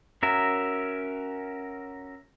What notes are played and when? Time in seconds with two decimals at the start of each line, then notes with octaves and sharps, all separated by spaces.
0.23 C#4 F#4 A#4 E5